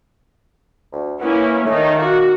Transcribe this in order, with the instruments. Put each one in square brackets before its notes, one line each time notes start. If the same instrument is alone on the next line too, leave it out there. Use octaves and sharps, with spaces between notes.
[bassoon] D2
[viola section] A#3 C#4 E4 [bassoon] B3
[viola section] D#3 D#4 [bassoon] A3
[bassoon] A#3 [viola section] F#4